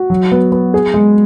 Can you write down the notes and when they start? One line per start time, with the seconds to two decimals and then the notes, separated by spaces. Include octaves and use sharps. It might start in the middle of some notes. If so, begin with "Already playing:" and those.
Already playing: F#4
0.10 F#3
0.32 B3
0.52 B3
0.74 G#4
0.94 G#3